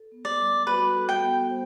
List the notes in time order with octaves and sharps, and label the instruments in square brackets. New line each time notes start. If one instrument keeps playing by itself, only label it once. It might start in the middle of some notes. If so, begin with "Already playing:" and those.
Already playing: [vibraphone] A4
B3
[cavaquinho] D5
[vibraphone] G3
[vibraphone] F#4 [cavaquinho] B4
[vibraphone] A4
[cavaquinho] G5
[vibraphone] B3
C5